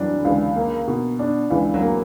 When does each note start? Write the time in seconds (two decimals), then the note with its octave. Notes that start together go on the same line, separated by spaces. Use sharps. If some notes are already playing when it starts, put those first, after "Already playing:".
Already playing: E3 F#3 G3 D4
0.19 D3
0.25 C#2 E3
0.56 A#3
0.88 B2
1.19 D4
1.50 C#2 E3
1.74 F#3
1.81 A#3